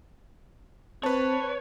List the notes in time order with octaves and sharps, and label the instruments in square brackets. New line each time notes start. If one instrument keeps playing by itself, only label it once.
[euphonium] C4 [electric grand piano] B4 A5 [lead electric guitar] C#5